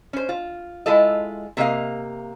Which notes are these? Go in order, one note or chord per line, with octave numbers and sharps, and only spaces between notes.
C#4 C5
F4
G#3 E4 F4 A4 D#5
C3 A#3 D#5 F5